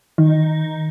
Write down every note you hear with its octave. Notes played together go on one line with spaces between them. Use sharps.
D#3